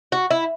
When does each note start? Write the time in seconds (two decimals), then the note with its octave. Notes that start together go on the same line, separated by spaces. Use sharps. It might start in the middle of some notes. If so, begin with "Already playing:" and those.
0.12 F#4
0.31 E4